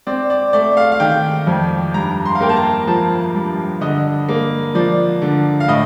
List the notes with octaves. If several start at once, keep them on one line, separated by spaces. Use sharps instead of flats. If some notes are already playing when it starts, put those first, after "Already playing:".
C4 D5
D5
A3 D5
F5
F5
D#3 G5
F2
G2 A#5
C6
F5
A#3 G5
A5
A#5
F3 A5
G2
D3 D#5
A#3
F3 D5
D3
F5
A2 D#5